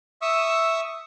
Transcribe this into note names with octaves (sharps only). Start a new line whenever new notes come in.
E5 C#6 D#6 E6